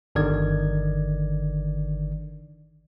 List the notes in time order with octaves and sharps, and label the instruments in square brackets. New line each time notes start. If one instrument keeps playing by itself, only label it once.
[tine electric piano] G1 D3 D#3 D5 G#6